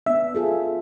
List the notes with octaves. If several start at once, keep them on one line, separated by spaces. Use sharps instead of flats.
B3 D4 E5
F4 G#4 A4